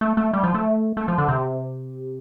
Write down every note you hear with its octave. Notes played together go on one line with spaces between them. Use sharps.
A3
A3
G3
F3
A3
A3
F3
D3
C3